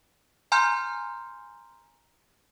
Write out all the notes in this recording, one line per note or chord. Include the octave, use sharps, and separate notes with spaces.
G#5 A#5 C6 F6 G6